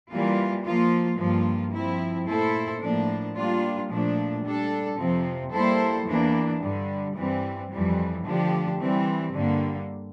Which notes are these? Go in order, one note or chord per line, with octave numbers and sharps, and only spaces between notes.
E3 G3 A#3 F4
F3 A#3 F4
G2 F3 A#3 F4
F3 C4 E4
A#2 A3 E4 A4 C5
A2 F3 A#3 D4
G3 A#3 D4 F4
A#2 F3 A3 D4
G3 D4 A4
F2 C3 F3 C4
G3 A#3 E4 A4 C5
E2 E3 A#3 D4
G2 D3 G3
G2 E3 G3 C4
F2 E3 G3
D3 F3 A3 D4 G4
E3 G3 C4
G2 D3 G3 A#3